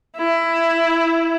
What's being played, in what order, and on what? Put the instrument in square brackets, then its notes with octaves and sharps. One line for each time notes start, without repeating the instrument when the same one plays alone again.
[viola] E4